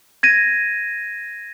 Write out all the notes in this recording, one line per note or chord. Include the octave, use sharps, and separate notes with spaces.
G#6 A#6 D#7